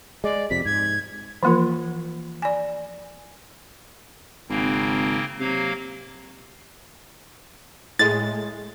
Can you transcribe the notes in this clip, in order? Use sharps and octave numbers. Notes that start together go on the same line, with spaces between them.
G#3 D5
F2 C3 B6
G#2 G#6
E3 F3 A#3 F4 A#4
D5 G#5
G#1 C#3 A#3 C4
C3 F#3 A#3 F5
A2 G#3 A6